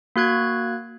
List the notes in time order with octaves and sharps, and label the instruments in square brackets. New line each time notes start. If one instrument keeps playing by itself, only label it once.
[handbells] A#3 F#4 F#6 G#6